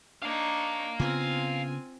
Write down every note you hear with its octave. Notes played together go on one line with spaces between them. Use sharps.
D4 D#4 C#5 F5 A#5
C#3 B3 C4 F4 G#5